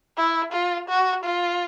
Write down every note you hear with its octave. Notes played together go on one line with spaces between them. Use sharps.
E4
F4
F#4
F4